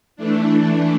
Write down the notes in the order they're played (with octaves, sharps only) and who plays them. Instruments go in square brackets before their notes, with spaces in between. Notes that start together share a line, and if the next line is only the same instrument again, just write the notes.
[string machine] E3 A3 D4